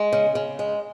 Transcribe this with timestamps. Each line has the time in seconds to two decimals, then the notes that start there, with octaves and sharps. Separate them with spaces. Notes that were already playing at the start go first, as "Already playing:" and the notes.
Already playing: G#3
0.12 C#3
0.35 C#3
0.59 G#3